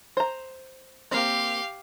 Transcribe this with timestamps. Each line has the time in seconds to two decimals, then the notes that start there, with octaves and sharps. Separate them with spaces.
0.17 C5 A#5
1.11 A#3 C4 G4 F5